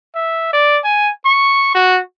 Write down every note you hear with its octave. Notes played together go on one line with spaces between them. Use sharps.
E5
D5
G#5
C#6
F#4